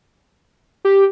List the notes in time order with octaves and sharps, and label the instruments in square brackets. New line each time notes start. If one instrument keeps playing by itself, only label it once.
[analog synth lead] G4